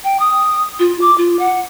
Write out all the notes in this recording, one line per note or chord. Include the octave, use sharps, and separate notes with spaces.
G5
D#6
F4
D6
F4
F#5